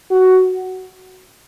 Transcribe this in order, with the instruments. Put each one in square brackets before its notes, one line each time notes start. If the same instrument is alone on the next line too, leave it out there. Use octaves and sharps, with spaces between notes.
[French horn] F#4